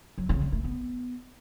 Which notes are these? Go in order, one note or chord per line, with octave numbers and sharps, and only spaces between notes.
F#3
C#3
G3
A3
B3